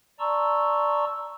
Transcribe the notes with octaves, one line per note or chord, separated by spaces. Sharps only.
D5 A5 A#5 C6 C#6 E6